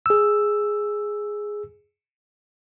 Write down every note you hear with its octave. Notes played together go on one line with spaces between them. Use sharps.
G#4 E6